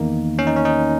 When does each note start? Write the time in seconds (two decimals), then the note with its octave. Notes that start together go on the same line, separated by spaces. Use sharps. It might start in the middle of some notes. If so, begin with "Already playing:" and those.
Already playing: E2 D#3 A#3 D#4
0.39 C#4
0.47 D#4
0.56 C#4
0.65 D#4